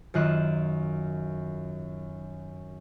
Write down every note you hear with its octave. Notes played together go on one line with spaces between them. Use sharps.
F#2 D#3 F4 D#5 F#6 E7